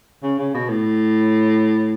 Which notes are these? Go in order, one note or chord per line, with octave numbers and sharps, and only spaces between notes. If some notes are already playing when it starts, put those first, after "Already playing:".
C#3
C#3
B2
A2